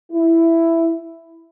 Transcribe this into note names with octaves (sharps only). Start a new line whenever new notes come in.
E4